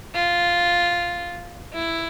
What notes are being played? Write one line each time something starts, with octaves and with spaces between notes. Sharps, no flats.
F4
E4